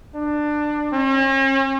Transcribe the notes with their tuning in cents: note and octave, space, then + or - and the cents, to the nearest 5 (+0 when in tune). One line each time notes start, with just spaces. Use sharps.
D4 +20
C#4 -45